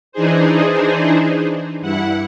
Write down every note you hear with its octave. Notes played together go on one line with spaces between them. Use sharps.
E3 D4 D#4 G#4 C5
G2 E4 F#5